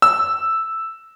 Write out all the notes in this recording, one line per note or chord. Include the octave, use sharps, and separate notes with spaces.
E6